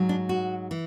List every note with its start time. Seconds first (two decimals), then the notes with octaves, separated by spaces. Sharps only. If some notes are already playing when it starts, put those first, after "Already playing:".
Already playing: G#2 F#3
0.09 D4
0.29 F#4
0.71 E3